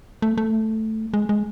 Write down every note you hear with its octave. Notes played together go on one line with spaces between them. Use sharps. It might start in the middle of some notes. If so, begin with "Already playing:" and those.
A3
A3
G#3
G#3